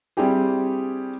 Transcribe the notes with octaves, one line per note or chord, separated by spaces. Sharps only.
G3 C4 D4 E4 G4 G#4